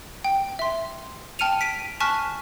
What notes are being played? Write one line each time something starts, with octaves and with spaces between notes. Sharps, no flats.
G5
E5 C6
G5 A5 F6 C#7 D#7 F7
B6 D7 D#7
G#5 A5 C#6 F6 F#6 B6